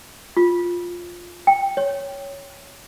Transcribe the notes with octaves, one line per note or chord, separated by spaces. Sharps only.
F4
G5
C#5